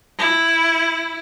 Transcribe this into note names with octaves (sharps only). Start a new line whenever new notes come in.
E4